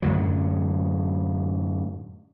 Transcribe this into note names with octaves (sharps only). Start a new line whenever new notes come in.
F#2 A2 D3 F#3